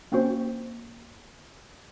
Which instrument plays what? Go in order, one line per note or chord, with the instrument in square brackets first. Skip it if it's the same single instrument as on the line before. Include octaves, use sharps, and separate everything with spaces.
[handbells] A#3 C4 C#4 F#4 C5